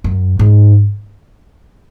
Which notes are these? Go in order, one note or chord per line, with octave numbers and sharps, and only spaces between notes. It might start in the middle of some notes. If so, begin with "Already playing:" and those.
F#2
G#2